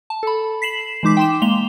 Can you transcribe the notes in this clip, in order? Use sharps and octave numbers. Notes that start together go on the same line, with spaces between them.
A5
A4 B5
B6 C7 E7 F#7
E3 G#3 D#4 D6 B6
G5 C6 E7
G#3 A#3 F7 G7